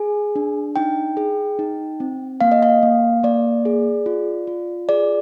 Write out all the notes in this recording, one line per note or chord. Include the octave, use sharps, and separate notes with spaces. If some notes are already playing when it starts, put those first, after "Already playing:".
Already playing: G#4 G#5
D4
D#4 G5
G#4
D#4
C4
A#3 F5
D#5
F5
A#3
A#3 D5
G#4
F4
F4
G#4 D5